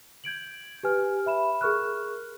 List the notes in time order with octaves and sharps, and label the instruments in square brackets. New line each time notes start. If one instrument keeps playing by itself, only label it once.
[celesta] G6 G#6 D7 F#7
G4 B4 G#5 F6
E5 B5 E7
G#4 A#4 C#6 F6 F#6